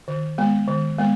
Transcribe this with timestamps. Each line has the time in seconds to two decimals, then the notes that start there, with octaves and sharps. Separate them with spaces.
0.08 D#3
0.38 G#3 B3
0.68 D#3
0.98 G#3 B3